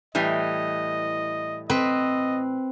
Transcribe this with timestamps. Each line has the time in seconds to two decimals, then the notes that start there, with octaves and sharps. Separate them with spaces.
0.15 A2 E3 G3 D#5
1.70 C4 B4 D#5